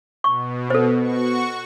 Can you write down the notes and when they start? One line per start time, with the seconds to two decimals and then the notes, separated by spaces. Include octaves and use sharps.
0.24 B2 C#6
0.70 B3 A4 C5
1.02 F#4 C#6